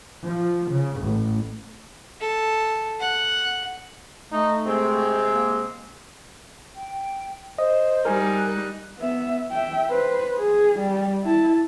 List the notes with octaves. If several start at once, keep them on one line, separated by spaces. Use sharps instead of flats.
F3
C#3
A1
A4
F#5
A3 D#4
C3 G#3 C4
A#3
G5
C5 D#5
G3 D#4 A#4 G#5
F#6
B3 E5
E5 G5
B4 C5
G#4
G3
E4 A5